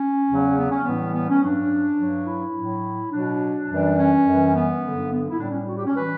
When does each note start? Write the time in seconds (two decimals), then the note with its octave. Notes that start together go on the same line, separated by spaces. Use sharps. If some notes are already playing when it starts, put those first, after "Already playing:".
Already playing: C#4
0.29 E2 C#3 F#3
0.58 B3
0.71 C#4
0.82 A2 E3 G3 B3
1.14 B3
1.29 C#4
1.43 G2 F#3 D4
1.99 G2 F#3
2.27 E4
2.56 A2 F#3
3.12 B2 F#3 D4
3.69 F#2 E3 G3
3.98 C#4
4.26 F#2 E3 G3
4.54 B3
4.83 G2 D3 F#3
5.11 B3
5.30 E4
5.39 A2 G3 D4
5.49 C#4
5.67 F#4
5.77 G4
5.86 C#4
5.96 E3 G3 B4